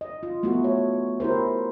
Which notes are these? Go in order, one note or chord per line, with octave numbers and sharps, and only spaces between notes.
D#5
F4
A3 B3 E4 F#4
C#5
E4 G4 A#4 C5